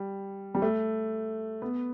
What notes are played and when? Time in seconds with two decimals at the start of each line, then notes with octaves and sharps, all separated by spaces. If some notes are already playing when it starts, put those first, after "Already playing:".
Already playing: G3
0.55 G3
0.62 A3
1.62 B3